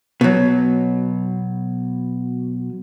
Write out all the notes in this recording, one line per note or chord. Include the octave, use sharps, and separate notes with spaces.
B2 F#3